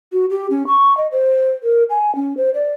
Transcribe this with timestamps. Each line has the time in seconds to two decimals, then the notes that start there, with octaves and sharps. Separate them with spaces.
0.13 F#4
0.30 G4
0.50 C#4
0.67 C#6
0.97 D#5
1.12 C5
1.63 A#4
1.90 G#5
2.16 C#4
2.37 C5
2.54 D5